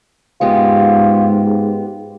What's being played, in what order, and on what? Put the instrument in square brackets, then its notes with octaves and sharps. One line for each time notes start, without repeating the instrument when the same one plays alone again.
[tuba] G#2 [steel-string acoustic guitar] G#3 B3 G4 [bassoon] F4